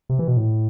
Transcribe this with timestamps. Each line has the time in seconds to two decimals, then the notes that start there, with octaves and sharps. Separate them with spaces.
0.09 C3
0.19 E3
0.28 B2
0.37 A2